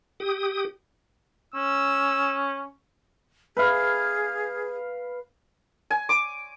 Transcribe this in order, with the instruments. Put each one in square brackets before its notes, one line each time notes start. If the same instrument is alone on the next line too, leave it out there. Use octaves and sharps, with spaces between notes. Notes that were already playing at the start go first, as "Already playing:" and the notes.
[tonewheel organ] G4 D#6
[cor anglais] C#4 [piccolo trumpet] E6
[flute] G#4 [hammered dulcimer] B4 F5
[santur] G#5
D6